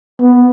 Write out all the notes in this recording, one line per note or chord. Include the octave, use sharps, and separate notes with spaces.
B3